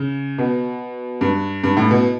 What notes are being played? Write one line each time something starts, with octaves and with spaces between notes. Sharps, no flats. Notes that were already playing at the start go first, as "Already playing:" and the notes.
Already playing: C#3
B2
G2
G2
A2
B2